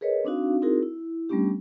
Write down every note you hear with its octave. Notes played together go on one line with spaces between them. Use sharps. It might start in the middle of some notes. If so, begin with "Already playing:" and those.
G#4 A#4 B4 C#5 D#5
C4 D4 D#4 F#4 F5
C4 D#4 E4 F#4 G#4 A#4
E4
G3 A3 B3 C#4 D4 G4